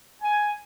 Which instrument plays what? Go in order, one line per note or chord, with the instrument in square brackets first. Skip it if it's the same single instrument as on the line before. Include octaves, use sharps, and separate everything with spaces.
[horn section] G#5